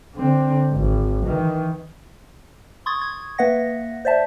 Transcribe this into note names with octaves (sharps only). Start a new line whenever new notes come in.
D3 C4
G#1
D#3 E3
C6 C#6 D#6 G#6 A6
G#6
A#3 B4 E5 F#5 A#6
C5 D5 E5 A5